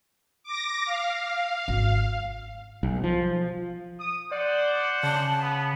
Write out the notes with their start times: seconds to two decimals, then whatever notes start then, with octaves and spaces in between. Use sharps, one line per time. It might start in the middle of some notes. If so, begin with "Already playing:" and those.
0.43 D6 A#6
0.85 F5
1.68 G#1
2.83 B1
3.04 F3
4.00 D#6
4.31 C5 D5 F#5
5.03 C#3 A5
5.40 B3